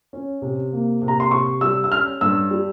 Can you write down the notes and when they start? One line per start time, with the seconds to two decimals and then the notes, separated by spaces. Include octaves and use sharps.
0.13 C#4
0.42 C3
0.73 A#3
1.02 C3
1.08 A#5
1.20 C6
1.31 C3 C#6
1.61 G3 E6
1.84 E6
1.92 C#4 F6
2.21 G2 E6
2.51 G3